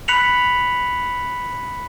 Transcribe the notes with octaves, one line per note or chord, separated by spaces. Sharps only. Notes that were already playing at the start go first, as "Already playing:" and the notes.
B5 F#6 B6 C#7 F7 F#7